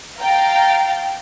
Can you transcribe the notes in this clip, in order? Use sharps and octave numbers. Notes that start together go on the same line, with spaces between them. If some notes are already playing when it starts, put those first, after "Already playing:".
F5 G5 A#5 A6